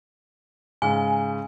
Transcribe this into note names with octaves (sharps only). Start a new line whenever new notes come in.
G#2 C#3 G#5